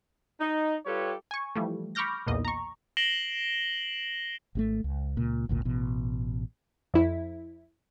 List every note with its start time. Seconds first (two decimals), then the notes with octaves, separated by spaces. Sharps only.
0.40 D#4
0.86 G3 F4 G4 A4 B4 C#5
1.31 G#5 C#6
1.56 E3 F3 G3 A3
1.95 B5 C#6 D6 F6 G6 A#6
2.27 B1 E2 A#2 D#5
2.45 A#5 C#6
2.97 A#6 C7 D7 E7 F#7 G7
4.55 G#1 B2 A3
4.84 C#2
5.17 C#2 A#2
5.49 G#1 D2 A#2
5.65 A1 B2
6.94 F2 E4